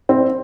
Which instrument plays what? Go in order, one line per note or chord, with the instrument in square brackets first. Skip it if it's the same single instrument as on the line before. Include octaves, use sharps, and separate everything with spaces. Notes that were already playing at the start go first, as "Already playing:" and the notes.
[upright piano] C4